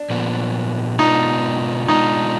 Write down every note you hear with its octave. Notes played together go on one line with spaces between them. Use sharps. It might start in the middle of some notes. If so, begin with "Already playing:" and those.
Already playing: D4
A#2 F3 B3
B2 G#3 B3 D4 D#4 F4
B2 G#3 B3 D4 D#4 F4